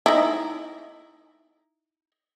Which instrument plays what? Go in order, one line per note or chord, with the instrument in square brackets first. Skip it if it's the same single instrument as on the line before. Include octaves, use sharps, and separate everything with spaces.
[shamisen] D#4 E4